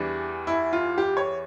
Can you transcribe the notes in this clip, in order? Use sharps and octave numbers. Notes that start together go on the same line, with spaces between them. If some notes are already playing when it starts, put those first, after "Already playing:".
Already playing: E2 E3 G3 D4
E4
F4
G4
C#5